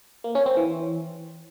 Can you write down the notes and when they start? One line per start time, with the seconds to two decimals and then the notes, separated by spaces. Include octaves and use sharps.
0.24 A#3
0.35 C#4
0.46 C4
0.57 E3